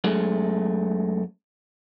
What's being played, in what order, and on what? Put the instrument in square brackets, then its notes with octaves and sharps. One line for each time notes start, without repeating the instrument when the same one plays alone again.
[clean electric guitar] F#2 G#3 A3